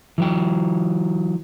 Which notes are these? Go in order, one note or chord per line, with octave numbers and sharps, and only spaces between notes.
E3 F#3 G5